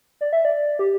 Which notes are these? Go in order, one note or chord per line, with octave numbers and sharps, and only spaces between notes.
D5
E5
D5
G4